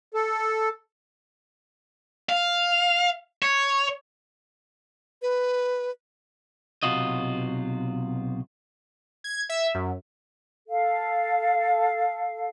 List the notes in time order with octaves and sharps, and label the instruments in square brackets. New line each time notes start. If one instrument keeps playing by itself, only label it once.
[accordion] A4
[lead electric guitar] F5
C#5
[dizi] B4
[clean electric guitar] B1 C3 F4 F#4 D#5
[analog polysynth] G#6
E5
F#2
[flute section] A4 F5